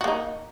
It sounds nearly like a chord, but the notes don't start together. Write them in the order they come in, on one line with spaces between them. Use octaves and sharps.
F#4 A#3 D#4